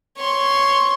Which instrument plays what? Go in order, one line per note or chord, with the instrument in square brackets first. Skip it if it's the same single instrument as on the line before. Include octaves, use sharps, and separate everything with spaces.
[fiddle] C#5 C6